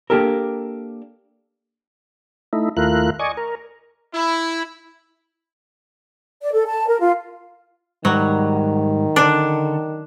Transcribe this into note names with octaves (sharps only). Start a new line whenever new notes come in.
A#3 D4 G4 A4 A#4
A3 D#4 E4
D#2 A3 E4 F4 A#4 F#6
D5 D#5 G#5 C#6
A#4
E4
D5
A4
A5
A#4
F4
G#2 D#3 F#3 G3
D3 D4 A4